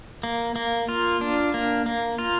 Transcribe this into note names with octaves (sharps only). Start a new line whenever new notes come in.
A#3
A#3
F4
D4
A#3
A#3
F4